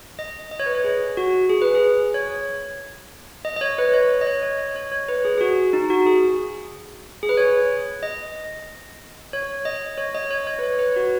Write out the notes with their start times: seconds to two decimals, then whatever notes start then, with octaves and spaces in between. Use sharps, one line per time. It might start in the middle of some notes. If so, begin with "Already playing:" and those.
0.19 D#5
0.51 D#5
0.60 C#5
0.66 B4
0.75 C#5
0.84 G#4
1.17 F#4
1.49 G#4
1.62 B4
1.75 G#4
2.14 C#5
3.45 D#5
3.56 D#5
3.61 C#5
3.78 B4
3.94 C#5
4.21 D#5
4.27 C#5
4.43 C#5
4.59 D#5
4.76 C#5
4.92 C#5
5.08 B4
5.25 G#4
5.38 G#4
5.41 F#4
5.73 D#4
5.90 F#4
6.06 G#4
7.23 G#4
7.29 B4
7.37 C#5
8.03 D#5
9.33 C#5
9.65 D#5
9.98 C#5
10.15 D#5
10.31 C#5
10.47 C#5
10.59 B4
10.63 C#5
10.79 B4
10.96 F#4